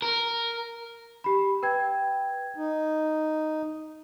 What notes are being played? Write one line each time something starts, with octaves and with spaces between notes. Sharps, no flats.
A#4
G4 B5
B4 G5 G#6
D#4